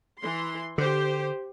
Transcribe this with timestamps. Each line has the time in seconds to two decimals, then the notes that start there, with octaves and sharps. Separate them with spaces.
0.21 E3 C6
0.78 D3 G4 C5